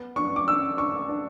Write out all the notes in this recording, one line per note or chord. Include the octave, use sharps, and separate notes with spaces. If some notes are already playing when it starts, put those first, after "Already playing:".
Already playing: B3
D4 C#6
D6
D4 E6
D4 C#6
D4